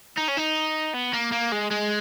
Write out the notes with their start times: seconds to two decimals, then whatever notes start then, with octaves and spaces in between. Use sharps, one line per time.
0.18 D#4
0.28 C#4
0.38 D#4
0.94 B3
1.13 A#3
1.32 A#3
1.52 G#3
1.71 G#3